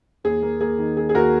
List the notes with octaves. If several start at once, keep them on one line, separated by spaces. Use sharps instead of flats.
D#2 G#4
A#3
A#3 G#4
D#3
D#3 G#4
G#4
D#2 F#4 A#4